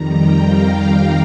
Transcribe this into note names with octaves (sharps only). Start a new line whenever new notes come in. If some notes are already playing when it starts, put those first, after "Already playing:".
Already playing: F2 D#3 G3 A#5
G5
F5
G5